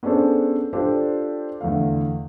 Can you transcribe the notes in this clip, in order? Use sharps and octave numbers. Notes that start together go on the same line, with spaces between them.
B3 C#4 D4 G#4 A4 C5
D4 F4 G4 A4 C5 D5
E2 D3 A3 F5